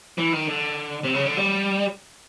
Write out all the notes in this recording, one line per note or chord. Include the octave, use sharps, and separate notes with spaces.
E3
D#3
D3
C3
C#3
D3
G3